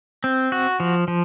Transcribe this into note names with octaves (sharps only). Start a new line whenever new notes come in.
C4
F#4
F3
F3